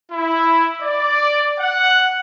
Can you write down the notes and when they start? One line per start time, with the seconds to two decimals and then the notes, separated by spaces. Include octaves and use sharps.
0.11 E4
0.82 D5
1.59 F#5